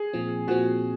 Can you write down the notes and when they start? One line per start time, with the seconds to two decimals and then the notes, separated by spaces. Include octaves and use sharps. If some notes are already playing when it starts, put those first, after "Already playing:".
Already playing: G#4
0.13 A#2 F3 C4
0.48 A#2 F3 C4 F#4